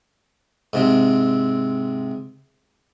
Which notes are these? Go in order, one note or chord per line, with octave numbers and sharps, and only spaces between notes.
G#2 C3 C4